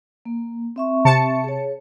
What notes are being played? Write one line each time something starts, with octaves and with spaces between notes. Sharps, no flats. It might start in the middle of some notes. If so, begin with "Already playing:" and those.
A#3
C4 E5 C#6
C3 A5 C#7
G#4 C#5